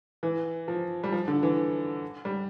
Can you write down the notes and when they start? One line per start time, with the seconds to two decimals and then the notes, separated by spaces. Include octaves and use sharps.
0.23 E3
0.68 F3
1.04 G3
1.12 F3
1.28 D3
1.43 E3
2.25 G3